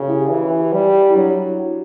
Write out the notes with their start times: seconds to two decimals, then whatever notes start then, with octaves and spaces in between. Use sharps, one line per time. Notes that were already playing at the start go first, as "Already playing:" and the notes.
Already playing: C#3 F#4 A#4
0.09 E4 G4
0.30 E3
0.73 G3
1.10 E4
1.15 F#3 D4 F#4